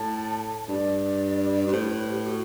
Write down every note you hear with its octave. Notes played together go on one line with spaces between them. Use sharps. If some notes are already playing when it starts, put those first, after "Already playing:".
Already playing: A2 A5
G2 D5
G2 B4
A2 C5
B4
G4
F#4